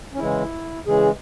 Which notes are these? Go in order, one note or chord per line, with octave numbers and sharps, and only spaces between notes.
C#4
C#3 E3 G#3 E4
C#3 E3 G#3 G#4